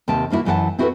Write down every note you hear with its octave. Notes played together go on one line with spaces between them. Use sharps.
D#2 C3 G5 A5
E2 A#3 C#4 E4 F#4
F#2 E3 D#4 F#4 F#5 A5
C4 E4 F#4 G#4 A4 B4